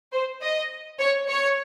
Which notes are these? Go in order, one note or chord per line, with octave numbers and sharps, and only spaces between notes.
C5
D#5
C#5
C#5